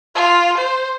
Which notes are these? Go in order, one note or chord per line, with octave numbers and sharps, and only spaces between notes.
F4
C5